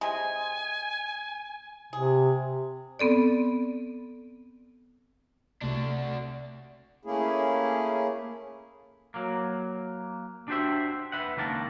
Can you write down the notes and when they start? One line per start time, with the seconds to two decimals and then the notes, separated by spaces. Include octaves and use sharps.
0.01 C3 G#3 G#5
1.93 C3 G#4
2.99 B3 C4 A4 D5
5.62 C2 C3 A3 D4 F#4
7.05 A3 A#3 C#4 E4 G#4
9.14 F#3 A#3
10.48 D4 F#4 G4 C5 E5
11.12 B4 E5 F#5
11.37 C#2 D#3 A#3 A#4 A5